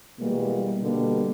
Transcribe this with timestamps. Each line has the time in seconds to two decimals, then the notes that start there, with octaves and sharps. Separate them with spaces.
0.19 B2 E3 G3 G#3 A#3
0.83 B2 D3 G3 A#3